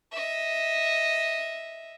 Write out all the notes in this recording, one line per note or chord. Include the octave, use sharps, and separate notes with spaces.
D#5 E5